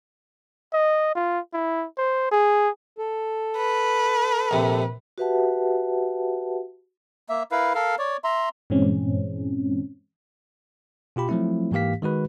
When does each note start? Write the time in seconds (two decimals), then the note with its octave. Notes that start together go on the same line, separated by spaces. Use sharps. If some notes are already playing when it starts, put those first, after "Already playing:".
0.73 D#5
1.15 F4
1.53 E4
1.98 C5
2.31 G#4
2.98 A4
3.57 B4
4.51 A#1 C3
5.18 F#4 G4 B4 E5 F#5 A5
7.29 A#3 E5
7.51 E4 A#4 B4 F5
7.75 A4 A#4 F5
7.99 C#5 D5
8.24 E5 A#5 C6
8.70 G2 A#2 E3 G#3 C4 C#4
11.16 B2 F4 G4 B5
11.29 F3 F#3 A3 C4 E4
11.72 G#2 E3 A#3 G4 F5 B6
12.02 D#3 G#3 F#4 B4